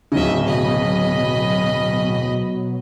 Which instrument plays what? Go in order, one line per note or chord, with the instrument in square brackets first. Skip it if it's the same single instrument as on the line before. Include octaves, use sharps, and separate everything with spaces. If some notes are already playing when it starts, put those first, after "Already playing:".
[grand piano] D1 C#3 [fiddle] D#5 E5
[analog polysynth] B2 F#3 [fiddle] D#5 B5